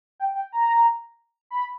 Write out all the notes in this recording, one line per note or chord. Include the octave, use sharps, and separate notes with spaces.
G5
G5
A#5
B5